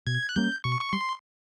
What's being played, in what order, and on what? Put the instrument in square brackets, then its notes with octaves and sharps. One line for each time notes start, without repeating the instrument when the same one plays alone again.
[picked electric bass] B2 [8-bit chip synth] G#6
[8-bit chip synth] F#6
[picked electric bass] G3 A#3 C#4 [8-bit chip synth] G6
[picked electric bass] B2 [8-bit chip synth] C#6
[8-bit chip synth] C#6
[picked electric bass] G3 [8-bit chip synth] C6